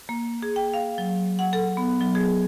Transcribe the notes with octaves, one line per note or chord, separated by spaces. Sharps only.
A#3
G#4
G5
F5
F#3
F#5
A4
B3
F#3
G#4